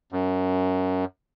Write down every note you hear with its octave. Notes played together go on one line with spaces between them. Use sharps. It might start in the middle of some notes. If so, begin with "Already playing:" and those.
F#2